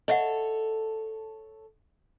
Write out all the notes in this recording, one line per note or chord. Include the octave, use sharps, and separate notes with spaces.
A4 C#5 D#5 E5 F#5